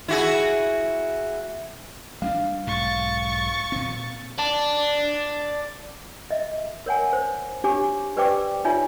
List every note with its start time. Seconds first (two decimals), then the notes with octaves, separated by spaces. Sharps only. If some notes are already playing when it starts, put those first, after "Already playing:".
0.08 E4 F#4 G#4
2.22 G3 C4 D4 F5
2.67 B1 G#2 C#6 A6
3.72 A#2 C4
4.39 D5 A5
6.31 D#5 E5
6.86 A#4 C#5 F#5 G#5
7.13 C5
7.64 D4 G4 C#5 G#5 D6
8.16 G4 B4 C5 D5 G5 D6
8.65 D#4 F4 C#5 E5 G#5